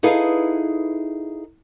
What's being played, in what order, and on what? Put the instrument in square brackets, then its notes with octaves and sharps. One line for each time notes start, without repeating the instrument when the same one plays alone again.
[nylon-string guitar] D#4 E4 G#4 A4 B4 F5